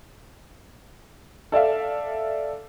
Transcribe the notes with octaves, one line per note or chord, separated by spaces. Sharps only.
A4 D5 E5 F5